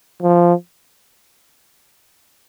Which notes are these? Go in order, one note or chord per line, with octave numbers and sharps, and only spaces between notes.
F3